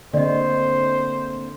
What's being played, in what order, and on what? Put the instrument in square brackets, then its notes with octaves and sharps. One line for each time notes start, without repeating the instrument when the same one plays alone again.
[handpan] D3 [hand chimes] A#3 C4 [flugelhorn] C5 [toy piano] D5 D#5